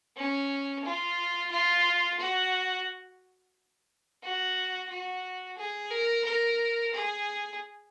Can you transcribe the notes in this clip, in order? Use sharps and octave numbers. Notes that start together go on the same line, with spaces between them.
C#4
F4
F4
F#4
F#4
F#4
G#4
A#4
A#4
G#4